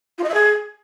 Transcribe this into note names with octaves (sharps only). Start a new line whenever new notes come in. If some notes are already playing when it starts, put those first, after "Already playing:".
F4
D#5
E5
G#4